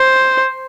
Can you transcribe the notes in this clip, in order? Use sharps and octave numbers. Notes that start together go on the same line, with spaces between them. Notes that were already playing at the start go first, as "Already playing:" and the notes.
Already playing: C5